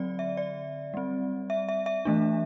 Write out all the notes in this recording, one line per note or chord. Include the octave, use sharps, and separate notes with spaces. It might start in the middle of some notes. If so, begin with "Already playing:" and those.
Already playing: D3 F#3 C4 D5
E5
D5
G3 C4
E5
E5
E5
E3 A3 D4